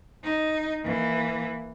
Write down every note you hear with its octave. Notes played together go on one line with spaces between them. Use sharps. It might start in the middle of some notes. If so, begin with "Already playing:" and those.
D#4
E3 A#3